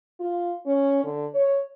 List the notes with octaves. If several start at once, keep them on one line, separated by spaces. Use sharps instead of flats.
F4
C#4
D3
C#5